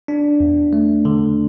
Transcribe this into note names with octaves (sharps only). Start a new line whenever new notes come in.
D4
E2
A3
D3